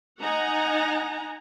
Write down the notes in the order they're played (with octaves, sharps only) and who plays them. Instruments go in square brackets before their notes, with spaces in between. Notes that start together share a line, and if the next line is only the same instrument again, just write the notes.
[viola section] D#4 F#5 G#5 A#5